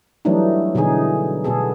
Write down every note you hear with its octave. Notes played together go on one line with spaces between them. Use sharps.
E3 F#3 G3 A3 D4 D#4
B2 D3 E3 D#4 G#4
B2 B3 G#4 A4